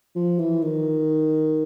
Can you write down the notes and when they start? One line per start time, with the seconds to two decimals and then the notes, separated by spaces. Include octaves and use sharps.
0.16 F3
0.39 E3
0.62 D#3